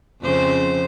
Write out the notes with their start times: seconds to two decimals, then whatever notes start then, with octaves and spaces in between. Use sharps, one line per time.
0.22 F2 C#3 C5